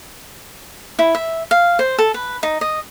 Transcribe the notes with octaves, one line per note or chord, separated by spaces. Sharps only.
E4
E5
F5
C5
A4
B4
D#4
D#5